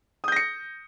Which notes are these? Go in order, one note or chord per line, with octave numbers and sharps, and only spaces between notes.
D#6 G6 A#6 C#7